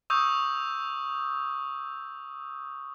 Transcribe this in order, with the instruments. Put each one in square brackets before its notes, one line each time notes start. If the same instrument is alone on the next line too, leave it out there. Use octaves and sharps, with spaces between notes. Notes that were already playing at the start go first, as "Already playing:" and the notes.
[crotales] C#6 D#6 E6 G6